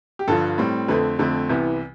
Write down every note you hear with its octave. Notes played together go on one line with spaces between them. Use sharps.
G4
G2 D3 F3 A4
A2 G3 C4
F2 D3 A3 C4 B4
F2 D3 A3 C4
C2 C3 E3 B3 E4